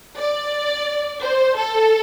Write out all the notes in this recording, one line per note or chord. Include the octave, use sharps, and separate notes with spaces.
D5
C5
A4